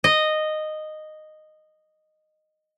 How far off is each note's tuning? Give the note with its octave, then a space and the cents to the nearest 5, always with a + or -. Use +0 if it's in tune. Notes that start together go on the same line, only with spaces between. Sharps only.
D#5 -10